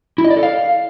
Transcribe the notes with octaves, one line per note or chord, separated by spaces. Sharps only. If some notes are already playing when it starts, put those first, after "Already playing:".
E4
D#5
D5
A4
F5